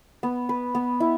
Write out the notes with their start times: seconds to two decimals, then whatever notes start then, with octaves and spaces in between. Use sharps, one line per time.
0.23 B3
0.49 B4
0.75 B3
1.00 E4